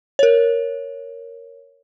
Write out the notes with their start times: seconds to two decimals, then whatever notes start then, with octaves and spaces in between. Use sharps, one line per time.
0.19 A#4 C#5